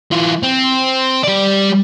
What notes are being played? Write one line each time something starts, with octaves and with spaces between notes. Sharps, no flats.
E3 F4
C4
G3 D5